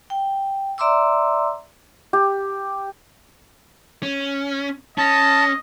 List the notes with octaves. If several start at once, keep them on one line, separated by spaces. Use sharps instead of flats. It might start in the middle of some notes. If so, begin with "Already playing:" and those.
G5
D5 E5 A#5 C6 D6 E6
G4
C#4
C#4 D#5 A5